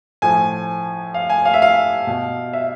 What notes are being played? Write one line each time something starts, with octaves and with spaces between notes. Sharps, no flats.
A2 F3 G#5
F5
G#5
F5
E5
F5
B2
E5